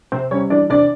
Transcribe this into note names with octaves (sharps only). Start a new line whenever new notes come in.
C3 C4 C5
G3 C#4 C#5
E3 D4 D5
C3 D4 D5